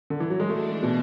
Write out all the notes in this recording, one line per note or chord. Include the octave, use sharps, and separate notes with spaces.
D3
E3
F#3
G#3
E3 G#3 A3 D4
B2